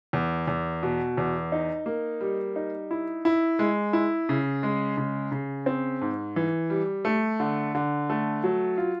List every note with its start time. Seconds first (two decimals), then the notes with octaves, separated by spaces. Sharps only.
0.13 E2
0.48 E2
0.83 B2
1.17 E2
1.52 D#4
1.86 A#3
2.21 G3
2.56 D#4
2.91 E4
3.25 E4
3.59 G#3
3.93 E4
4.29 C#3
4.63 G#3
4.97 C#3
5.32 C#3
5.66 C4
6.01 G#2
6.36 E3
6.70 G3
7.05 A3
7.40 D3
7.75 D3
8.10 A3
8.44 F#3
8.78 F4